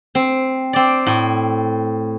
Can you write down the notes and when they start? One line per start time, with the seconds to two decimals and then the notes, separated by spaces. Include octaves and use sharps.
0.15 C4
0.73 C4 D5
1.07 A2